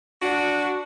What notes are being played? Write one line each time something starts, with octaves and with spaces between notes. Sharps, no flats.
D4 F#4